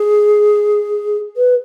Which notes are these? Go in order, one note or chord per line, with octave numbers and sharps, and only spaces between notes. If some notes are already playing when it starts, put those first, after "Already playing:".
Already playing: G#4
B4